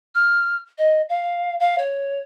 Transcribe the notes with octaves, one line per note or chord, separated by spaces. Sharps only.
F6
D#5
F5
F5
C#5